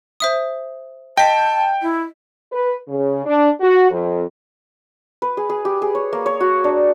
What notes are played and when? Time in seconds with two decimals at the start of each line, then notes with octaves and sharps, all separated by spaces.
0.20 C5 E5 D#6
1.17 D#5 G5 A5 B6
1.82 E4
2.52 B4
2.88 C#3
3.25 D4
3.61 F#4
3.91 F2
5.22 B4
5.37 G#4
5.49 G#4
5.65 G4
5.82 G#4
5.95 C#5
6.13 A#3
6.26 C#5
6.40 F#4
6.64 D4